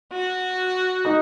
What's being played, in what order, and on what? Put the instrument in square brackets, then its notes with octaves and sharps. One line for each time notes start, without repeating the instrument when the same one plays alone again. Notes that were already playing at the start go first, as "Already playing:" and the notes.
[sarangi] F#4
[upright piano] D#4